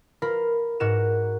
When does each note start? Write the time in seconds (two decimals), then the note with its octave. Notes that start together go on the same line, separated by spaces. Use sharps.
0.22 F4 A#4 B5
0.80 G#2 F#4 A#4 E7